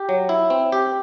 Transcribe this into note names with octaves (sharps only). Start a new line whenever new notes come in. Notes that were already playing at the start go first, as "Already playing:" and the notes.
Already playing: G4
F#3
E4
C4
G4